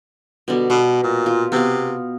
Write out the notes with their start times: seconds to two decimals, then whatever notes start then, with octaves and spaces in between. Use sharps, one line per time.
0.48 B2 D3 G3
0.70 B2 C#6
1.03 A#2
1.26 F4
1.52 C3 B3 F5